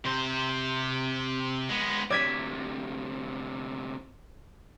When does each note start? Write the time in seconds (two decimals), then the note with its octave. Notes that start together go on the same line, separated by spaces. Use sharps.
0.05 C3 C5
1.70 G#3 B3
2.10 D2 C3 D5 G#6 B6